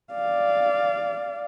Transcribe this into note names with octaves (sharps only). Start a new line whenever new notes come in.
D5 F5